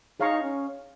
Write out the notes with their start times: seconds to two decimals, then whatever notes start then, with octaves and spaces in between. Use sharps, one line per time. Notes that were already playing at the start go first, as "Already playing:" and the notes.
0.20 D#4 G#4 C#5 F5 A#5 C#6
0.43 C#4